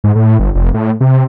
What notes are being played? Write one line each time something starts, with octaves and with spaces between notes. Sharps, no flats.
G#2
A2
G1
F1
A2
C3